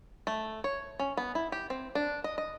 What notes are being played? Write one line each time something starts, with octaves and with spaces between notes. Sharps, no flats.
A3
C#5
C#4
B3
E4
G4
C4
D4
D#5
D#5